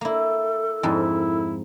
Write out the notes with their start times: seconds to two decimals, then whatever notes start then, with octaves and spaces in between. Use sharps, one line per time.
0.01 A#3 E4 A4
0.83 F2 G#2 E4